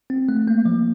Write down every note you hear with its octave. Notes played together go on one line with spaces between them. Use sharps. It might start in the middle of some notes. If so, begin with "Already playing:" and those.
C4
A3
A#3
F3